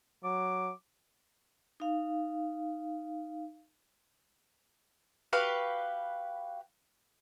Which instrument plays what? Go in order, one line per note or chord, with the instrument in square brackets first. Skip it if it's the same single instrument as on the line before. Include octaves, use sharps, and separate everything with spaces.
[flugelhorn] F#3 [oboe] D6
[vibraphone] D#4 F5
[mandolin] F#4 G4 B4 F5